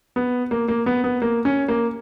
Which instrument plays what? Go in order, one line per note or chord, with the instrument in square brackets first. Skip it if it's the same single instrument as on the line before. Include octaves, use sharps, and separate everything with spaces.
[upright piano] B3
A#3
A#3
B3
B3
A#3
C#4
A#3